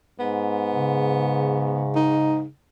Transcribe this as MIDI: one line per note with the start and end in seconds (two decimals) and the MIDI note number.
0.19 2.44 44
0.19 1.81 59
0.73 2.49 49
1.95 2.43 63